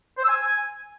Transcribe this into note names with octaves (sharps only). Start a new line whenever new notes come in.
C5
E6
G#5